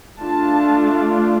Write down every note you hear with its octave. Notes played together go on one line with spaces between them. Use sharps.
A3 D4 F4 A5